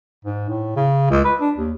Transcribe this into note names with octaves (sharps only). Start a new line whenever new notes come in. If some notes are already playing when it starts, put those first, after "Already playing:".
G#2
A2
C#3
C#2
B4
D4
D#2